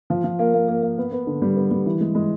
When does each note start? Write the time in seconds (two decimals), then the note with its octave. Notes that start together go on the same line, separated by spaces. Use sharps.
0.10 F3
0.24 F3
0.39 A#3
0.53 A#3
0.68 A#3
0.82 A#3
0.98 B3
1.12 B3
1.27 D3
1.42 G3
1.56 B3
1.71 G3
1.86 E3
2.00 G#3
2.15 G#3